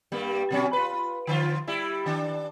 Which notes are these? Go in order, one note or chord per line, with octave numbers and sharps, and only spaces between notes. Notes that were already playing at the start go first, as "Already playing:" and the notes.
G2 G3 A#3
B2 F#3 C#4
F4 B4
D3 F3 F4
G3 E4
D#3 D4